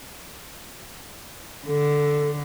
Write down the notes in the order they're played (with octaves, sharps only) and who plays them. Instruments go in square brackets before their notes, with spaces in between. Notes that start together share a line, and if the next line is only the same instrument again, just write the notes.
[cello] D3 [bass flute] A4